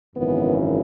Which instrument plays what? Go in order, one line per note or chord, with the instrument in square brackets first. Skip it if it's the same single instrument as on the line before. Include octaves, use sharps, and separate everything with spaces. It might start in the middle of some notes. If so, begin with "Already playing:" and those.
[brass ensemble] G#1 F#2 C#3 E3 B3